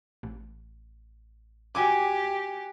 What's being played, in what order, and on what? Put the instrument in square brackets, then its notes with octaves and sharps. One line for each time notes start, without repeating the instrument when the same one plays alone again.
[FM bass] A1
[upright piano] F#4 G#5 D6 [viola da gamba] G4